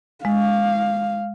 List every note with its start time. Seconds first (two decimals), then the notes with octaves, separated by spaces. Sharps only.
0.25 G#3 F5